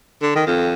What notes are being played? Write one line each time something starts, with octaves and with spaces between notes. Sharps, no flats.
D3
D#3
F2